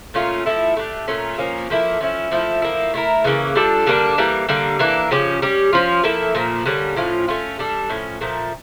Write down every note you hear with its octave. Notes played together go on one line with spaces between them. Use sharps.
A#2 A3 C#4 F4
F3 A3 E4
A3 D4 G4
A#2 A3 C#4 F4
A#2 F3 A#3 C#4
F3 A#3 E4 A4
F3 C#4 E4
F3 A3 E4
F3 A#3 E4
A3 E4 A#4
C#3 E3 A#3 C#4
G3 D4 F4 A4
D3 G3 A#3 D4
E3 G3 A#3
D3 G3 A#3
E3 A#3 D4
C#3 F3 C#4 G4
G3 C#4 G4
F3 C#4 F4
F3 A#3 E4 A4
A#2 F3 A#3
D3 G3 A#3 C#4
A2 F3 C#4 F4
A3 C#4 F4
G3 D4 A4
A2 F3 C#4
A#2 F3 A3